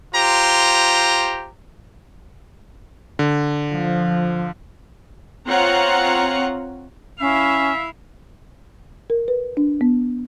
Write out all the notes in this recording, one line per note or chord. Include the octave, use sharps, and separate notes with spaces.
F4 G4 C5 A#5
D3
F3
C4 F4 C#5 F#5 A#5
C#4 E4 E5 F5
A#4
B4
D4
B3